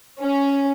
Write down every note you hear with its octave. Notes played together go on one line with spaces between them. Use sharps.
C#4